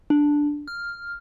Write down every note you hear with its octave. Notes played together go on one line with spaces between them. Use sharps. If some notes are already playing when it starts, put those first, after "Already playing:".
D4
F6